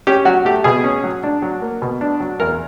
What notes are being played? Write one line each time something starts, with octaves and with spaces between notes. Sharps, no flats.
C#4 G4
F#3 F#4
A3 G4
B2 G#4
C#4
F#3
D4
F#3
A#3
B2
D4
F#3
E2 A#4